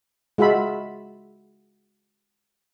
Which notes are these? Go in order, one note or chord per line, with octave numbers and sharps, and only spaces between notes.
G#3 F4 F#4 E5 B5